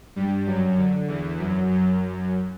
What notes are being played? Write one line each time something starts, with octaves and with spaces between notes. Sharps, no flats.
G2 G3
F#2 F#3
D3
E2 E3
F#2 F#3
F#2 F#3